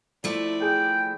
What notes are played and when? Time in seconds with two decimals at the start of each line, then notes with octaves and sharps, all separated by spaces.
0.24 F3 A3 E4 D5
0.62 G#4 G5